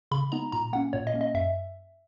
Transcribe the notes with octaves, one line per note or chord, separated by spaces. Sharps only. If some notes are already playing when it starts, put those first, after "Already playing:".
C#3 B5
G#3 B3 D#4 A#5
A#2 A#5
A#3 C#4 F#5
A#2 C#5
D#5
A#3 C#4
D#5
F#2 E5